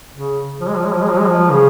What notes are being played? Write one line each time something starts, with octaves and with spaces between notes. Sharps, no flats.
C#3
F3
G#3
F3
G#3
F3
G#3
F3
G#3
F3
C#3